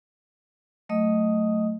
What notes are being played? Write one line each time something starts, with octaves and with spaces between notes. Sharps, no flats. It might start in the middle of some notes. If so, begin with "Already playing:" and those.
F#3 A3 D#5 D#6